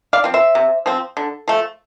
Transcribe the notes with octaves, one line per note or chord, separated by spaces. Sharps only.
D5 F5
F3 C4
C5 E5
C3
F3 C4
D3
F3 A3